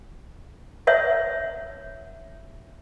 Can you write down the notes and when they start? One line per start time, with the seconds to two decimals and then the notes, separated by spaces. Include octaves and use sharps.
0.87 C#5 E5 F#5